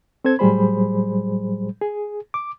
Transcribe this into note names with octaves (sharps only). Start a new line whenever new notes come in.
C4 A4 C5 G#6
A2 F#3 G3 G#4 C5 B5
G#4
D6